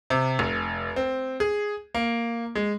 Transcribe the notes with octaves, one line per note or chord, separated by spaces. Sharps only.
C3
F1
C4
G#4
A#3
G#3